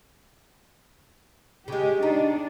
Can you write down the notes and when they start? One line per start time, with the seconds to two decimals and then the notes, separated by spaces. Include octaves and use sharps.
1.68 C#3 G#3 G4
2.03 D4 D#4